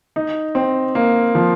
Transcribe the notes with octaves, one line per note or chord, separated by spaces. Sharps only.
D#4
C4
A#3
F3